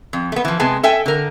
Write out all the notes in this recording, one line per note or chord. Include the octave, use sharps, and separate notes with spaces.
F2
A3 B3
E3 F3
C3 G#3 B3 G#4 A5
A4 E5 G5 G#5
D3 A#4